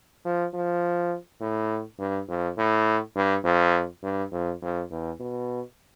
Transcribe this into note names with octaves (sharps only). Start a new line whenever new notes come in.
F3
F3
A2
G2
F2
A2
G2
F2
G2
F2
F2
E2
B2